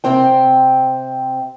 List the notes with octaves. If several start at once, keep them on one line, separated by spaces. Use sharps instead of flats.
C3 C4 C5 G5